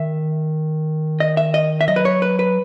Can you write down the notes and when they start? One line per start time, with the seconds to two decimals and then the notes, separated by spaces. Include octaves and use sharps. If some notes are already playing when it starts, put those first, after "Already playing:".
Already playing: D#3 E5
1.20 D#5
1.37 E5
1.54 D#5
1.81 E5
1.88 F#3 D#5
1.96 B4
2.05 C#5
2.22 B4
2.39 B4